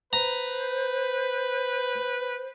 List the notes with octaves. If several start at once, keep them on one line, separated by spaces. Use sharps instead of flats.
B4 C5 A#5